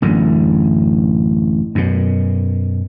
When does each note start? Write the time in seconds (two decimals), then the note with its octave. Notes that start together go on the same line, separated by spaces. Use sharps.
0.02 A1 F#2 D3
1.75 F#2 B2